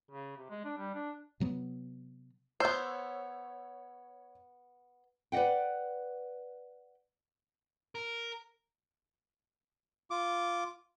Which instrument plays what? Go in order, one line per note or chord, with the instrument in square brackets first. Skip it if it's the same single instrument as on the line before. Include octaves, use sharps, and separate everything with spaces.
[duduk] C#3
C3
G#3
D4
G3
D4
[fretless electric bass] C3 F#3 B3
[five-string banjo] B3 C5 [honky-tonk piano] C#5 E6 G6
[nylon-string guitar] B4 D5 D#5 F#5 G5
[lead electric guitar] A#4
[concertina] F4 D6